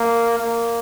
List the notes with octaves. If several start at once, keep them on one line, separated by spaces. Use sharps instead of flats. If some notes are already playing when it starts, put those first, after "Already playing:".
Already playing: A#3
A#3